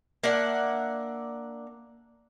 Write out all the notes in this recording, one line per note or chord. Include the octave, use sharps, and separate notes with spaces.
A#3 D4 E5 F#5